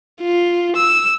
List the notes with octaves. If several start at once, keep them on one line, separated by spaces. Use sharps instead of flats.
F4
E6